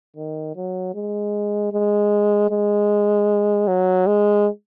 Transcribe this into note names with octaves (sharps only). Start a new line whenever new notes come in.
D#3
F#3
G#3
G#3
G#3
F#3
G#3